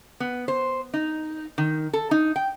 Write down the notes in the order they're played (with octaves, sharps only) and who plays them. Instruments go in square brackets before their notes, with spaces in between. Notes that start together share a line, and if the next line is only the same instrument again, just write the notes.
[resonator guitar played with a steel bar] B3
C5
D#4
D#3
A4
D#4
G5